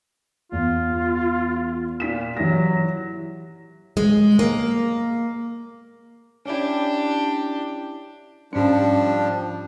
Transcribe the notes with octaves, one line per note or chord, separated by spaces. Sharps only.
E2 F4
A#2 F4 B6 E7
E3 F#3 G4 A#6
G#3
A#3
C#4 D4 E4 G4
G#2 F3 G3 C#4 D4